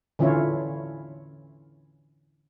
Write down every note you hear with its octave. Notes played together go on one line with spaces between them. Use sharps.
D3 E3 C#4 E4 F4 C#5